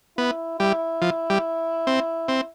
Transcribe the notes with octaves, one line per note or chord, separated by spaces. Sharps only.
B3 E4
G3 E4
F3
G3
C4
C4